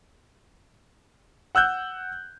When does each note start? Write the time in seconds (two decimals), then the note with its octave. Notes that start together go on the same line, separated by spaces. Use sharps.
1.55 F#5 E6 F#6 G6